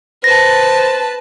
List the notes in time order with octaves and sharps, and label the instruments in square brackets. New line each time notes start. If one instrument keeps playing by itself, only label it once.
[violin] B4 A5 [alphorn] C5 [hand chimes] A#6